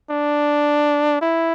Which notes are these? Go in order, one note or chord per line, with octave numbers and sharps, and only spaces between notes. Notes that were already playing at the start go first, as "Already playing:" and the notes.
D4
E4